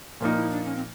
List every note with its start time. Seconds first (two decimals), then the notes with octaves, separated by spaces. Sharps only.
0.20 A#2 F3 A#3 D#4 A#4
0.36 E4
0.50 D4
0.65 C#4
0.75 C4